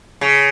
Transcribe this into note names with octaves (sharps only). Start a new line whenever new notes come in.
C#3